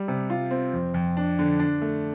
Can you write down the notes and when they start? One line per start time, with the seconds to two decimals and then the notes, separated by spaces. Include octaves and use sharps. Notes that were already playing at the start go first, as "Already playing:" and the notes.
Already playing: G3
0.08 C3
0.30 F4
0.51 C4
0.73 F2
0.94 F2
1.17 D4
1.39 D3
1.60 D4
1.82 A3